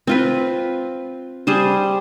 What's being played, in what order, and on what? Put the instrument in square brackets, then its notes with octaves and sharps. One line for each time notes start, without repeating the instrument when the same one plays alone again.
[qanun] C4 F4 B4
G3 G#4 C5